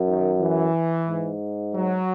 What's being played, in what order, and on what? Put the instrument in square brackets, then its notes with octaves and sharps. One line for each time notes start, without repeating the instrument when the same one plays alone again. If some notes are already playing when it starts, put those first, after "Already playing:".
Already playing: [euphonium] F#2
[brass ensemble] D#3
E3
[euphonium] G#2
[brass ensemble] F#3